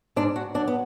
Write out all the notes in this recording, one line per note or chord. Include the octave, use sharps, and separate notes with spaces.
G#2 D4
F#4
F#3 D4
B3